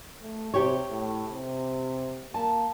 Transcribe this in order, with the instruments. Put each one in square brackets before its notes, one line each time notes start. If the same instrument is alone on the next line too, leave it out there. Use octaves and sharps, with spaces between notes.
[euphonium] A3
[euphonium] C3 [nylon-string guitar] G4 C#5
[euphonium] A2
C3
[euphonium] A#3 [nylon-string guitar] A5